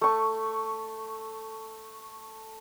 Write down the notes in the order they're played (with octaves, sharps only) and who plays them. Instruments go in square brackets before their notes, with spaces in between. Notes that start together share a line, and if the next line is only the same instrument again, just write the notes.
[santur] A3 C#6